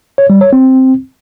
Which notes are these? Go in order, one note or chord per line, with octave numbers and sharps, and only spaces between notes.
C#5
G3
C#5
C4